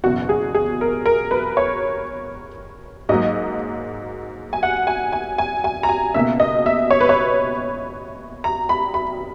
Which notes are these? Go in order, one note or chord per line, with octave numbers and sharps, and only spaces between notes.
F#1 E2 B2 F#4
G#4
G#4
A#4
A#4
B4
C#5
G#2 F#3 A#3 D#5
G#5
F#5
G#5
G#5
G#5
G#5
A#5
G#5
C#2 B2 A#3 E5
D#5
E5
C#5
B4
C#5
A#5
B5
B5